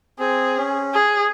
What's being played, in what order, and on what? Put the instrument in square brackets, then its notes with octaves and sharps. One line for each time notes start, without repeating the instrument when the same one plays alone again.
[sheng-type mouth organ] C4 [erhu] G#4
[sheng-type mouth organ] C#4
[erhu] G#4